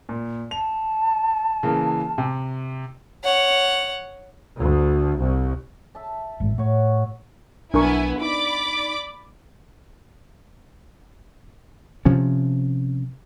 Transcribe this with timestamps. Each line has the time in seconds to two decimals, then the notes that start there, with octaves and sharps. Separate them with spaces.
0.09 A#2
0.51 A5 F7
1.63 C#3 E3 A#3
2.18 C3
3.24 C#5 F#5
4.58 D2
5.18 C2
5.95 E5 A5
6.40 A1 G#2
6.58 A2 F#4 C#5
7.74 B1 F#3 B3 D4 E4 A#4 G#5 C#6
8.22 D#4 D5 B5 D6
12.05 C3 F3 C#4